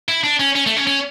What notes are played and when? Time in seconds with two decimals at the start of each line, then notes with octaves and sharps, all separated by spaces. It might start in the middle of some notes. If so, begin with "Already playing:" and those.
0.08 E4
0.24 D4
0.40 C#4
0.55 C#4
0.66 A3
0.77 C#4
0.87 C#4